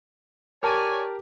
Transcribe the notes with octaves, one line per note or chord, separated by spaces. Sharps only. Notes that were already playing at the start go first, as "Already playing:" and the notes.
G4 A#4 C#5 D5 G#5 A5